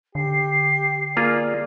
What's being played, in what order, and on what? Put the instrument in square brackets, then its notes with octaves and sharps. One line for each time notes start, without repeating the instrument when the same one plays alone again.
[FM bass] D3 [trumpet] G4 [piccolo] C7
[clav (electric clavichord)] A#3 F4 G#4 [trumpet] D5